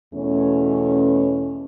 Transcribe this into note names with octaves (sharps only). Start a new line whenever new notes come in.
E2 B2 A3 C#4